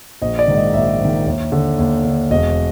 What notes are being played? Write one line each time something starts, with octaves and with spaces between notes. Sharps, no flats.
A#1 D#5
D5
G#2 D#3
D#5
A#1 E5
G#2
D#3
D#2
D3
D#2
D3
E1 D#5